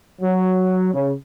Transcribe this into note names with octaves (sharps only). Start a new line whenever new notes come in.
F#3
C#3